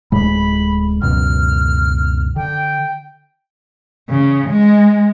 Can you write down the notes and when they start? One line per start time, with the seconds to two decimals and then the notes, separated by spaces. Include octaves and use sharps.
0.12 D1 A2 G#3 B5
1.02 C#2 F#2 B2 F6
2.36 D3 G5
4.09 C#3
4.49 G#3